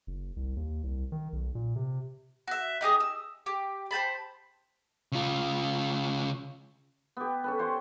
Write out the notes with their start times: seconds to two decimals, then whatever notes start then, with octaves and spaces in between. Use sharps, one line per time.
0.07 F#1
0.36 C2
0.56 D#2
0.83 C2
1.12 D#3
1.33 B1
1.55 A#2
1.76 C3
2.48 F#4 E5
2.81 D#4 G4 G#4 D#5
3.00 E6
3.46 G4
3.91 C5 G5 A5 B5
5.12 C#3 F4
7.17 B3 G4
7.44 C#4 A4 B4
7.59 C5 C#5 G5 C6